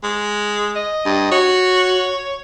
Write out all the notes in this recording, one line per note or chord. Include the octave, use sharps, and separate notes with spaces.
G#3
D#5
G2
F#4 C#5